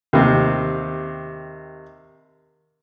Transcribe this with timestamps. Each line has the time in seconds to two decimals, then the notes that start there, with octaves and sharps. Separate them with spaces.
0.13 D#2 C3